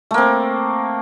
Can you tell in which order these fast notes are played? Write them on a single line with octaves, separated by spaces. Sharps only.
A3 A#3 C4